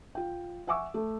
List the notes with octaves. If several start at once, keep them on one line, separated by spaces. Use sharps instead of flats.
F4 G5
E5 F#5 G#5 C#6 D6 E6
A3